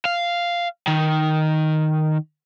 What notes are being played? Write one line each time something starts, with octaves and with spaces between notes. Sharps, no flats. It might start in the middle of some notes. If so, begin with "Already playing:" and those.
F5
D#3